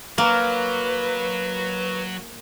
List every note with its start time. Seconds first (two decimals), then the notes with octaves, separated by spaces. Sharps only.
0.18 F#3 A#3 B4